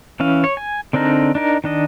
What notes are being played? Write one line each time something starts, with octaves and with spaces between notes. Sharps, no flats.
E3 C#4 F5
C#5
G#5
D3 C4 D4 D#4 A#4
D4 D#4 A#4
D#3 D4 D#5